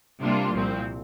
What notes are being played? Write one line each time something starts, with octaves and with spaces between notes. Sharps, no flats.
C3 G3 A#3 D4 F4
C2 A#2 F3 C4